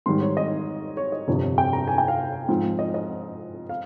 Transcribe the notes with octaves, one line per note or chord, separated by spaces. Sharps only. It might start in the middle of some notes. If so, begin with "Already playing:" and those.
G#2 D#3 G3 C6
C#5
D#5
C#5
D#5
G1 F2 C3
G5
A#5
G#5
G5
F5
G#2 F3 C4
D#5
D#5
F5